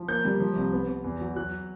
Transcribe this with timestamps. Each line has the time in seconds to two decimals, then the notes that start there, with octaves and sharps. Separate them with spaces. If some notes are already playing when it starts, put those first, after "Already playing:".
Already playing: F3
0.08 A#3 G6
0.25 G3
0.40 F3
0.56 C2
0.73 B3
0.88 B3
1.04 E2
1.21 F#3
1.36 F#3 F#6